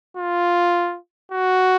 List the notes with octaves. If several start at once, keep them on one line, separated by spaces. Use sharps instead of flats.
F4
F#4